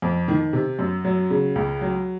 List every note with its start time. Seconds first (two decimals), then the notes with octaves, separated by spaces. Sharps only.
0.02 F2
0.28 D#3
0.53 C3
0.79 F#2
1.05 F#3
1.30 C#3
1.55 C#2
1.81 F#3